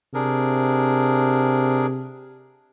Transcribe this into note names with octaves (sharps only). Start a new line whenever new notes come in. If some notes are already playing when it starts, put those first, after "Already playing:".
C3 D4 G#4 A#4